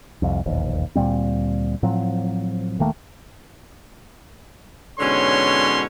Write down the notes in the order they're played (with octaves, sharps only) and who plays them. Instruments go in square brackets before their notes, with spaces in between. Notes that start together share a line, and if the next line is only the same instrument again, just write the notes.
[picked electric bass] C2 F2
E1 A#1 D#2
D2 A#2 G3 C4
A2 F3 F#3 C4
D#1 D#3 A3 A#3
[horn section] G#2 B2 D3 C#4 C#5 C6